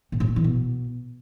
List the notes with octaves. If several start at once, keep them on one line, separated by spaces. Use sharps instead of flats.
A#2
A2
A#2
E3
B2